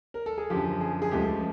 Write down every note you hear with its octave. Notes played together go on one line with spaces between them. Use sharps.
A#4
A4
G#4
F#2 D3 F3 G4
G#4
G#4
C#2 C#3 F3 A3 G4